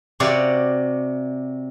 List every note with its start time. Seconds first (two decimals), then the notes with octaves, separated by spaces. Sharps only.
0.20 C3 F#4 C#5 D5 F5